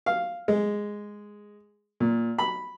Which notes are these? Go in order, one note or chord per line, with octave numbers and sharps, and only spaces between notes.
F5
G#3
A#2
B5